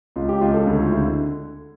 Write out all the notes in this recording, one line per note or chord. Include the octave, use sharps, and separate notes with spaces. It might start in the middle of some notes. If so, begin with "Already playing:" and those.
C#2 F4
G4
C#2 F4
A4
D2
F4
D3 E4